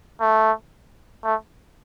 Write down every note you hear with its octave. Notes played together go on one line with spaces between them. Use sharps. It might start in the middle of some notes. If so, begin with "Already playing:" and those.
A3
A3